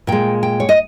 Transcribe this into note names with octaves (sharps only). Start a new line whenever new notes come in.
A#2 G#3 G5
G5
C#5
D#5